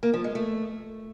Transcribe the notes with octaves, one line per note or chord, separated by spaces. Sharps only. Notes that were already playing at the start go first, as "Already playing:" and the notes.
A#3
F3
G#3
A3